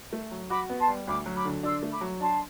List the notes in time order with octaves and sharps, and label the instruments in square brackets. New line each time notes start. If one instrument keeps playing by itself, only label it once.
[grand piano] A3
F#3
[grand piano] F#4 [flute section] B5 D6
[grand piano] B3
[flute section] A5 C6
[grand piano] G3
[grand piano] D2 [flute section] B5 D6
[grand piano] F#3
[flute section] B5 D6
[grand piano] D3
[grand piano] D4 [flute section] C6 E6
[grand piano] A3
[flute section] B5 D6
[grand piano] F#3
[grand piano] D4 [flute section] A5 C6